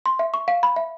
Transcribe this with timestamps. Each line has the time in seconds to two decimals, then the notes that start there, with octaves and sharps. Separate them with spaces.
0.06 C6
0.19 E5
0.34 C#6
0.48 F5
0.63 B5
0.76 E5